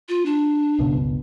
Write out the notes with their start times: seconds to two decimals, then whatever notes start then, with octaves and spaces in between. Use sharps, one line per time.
0.09 F4
0.26 D4
0.79 G1 C#2 B2